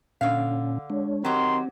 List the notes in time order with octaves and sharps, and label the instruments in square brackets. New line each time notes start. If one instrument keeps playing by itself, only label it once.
[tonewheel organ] A#2 C#4 [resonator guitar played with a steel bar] D3 F5
[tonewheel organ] G#3 D4 C#5
[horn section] D#3 D#4 C6 [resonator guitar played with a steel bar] F#3 G4 [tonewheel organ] C4